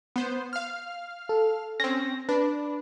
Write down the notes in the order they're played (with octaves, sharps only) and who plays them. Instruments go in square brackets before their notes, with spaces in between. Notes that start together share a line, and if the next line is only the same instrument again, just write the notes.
[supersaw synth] B3 C5
F5 F6
[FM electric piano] A4
[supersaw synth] C4 C#4 [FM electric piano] A#6
[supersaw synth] D4 [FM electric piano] B4